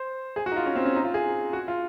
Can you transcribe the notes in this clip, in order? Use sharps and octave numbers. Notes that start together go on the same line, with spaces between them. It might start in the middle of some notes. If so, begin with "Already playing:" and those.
Already playing: C5
G#4
F#4
D#4
F4
C#4
C4
C#4
D#4
F4
G#4
F#4
F4